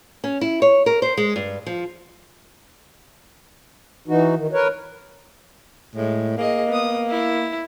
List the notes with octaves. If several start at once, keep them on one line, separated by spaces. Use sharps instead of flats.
C#4
E4
C#5
A#4
C5
G#3
G2
F3
E3 D#4 F#4
D#3
A#4 B4 C#5
A2 G#3
A#3 G#4 D#5
B3 D#6
E4